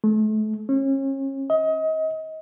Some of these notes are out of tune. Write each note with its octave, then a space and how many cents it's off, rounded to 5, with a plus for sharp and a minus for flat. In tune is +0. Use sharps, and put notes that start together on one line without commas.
A3 -35
C#4 -35
D#5 +30